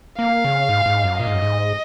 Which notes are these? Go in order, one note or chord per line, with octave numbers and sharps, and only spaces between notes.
A#3 F5
C#3
G#2
G#2
F#2
A#2 D#5
G#2
F#2
G#2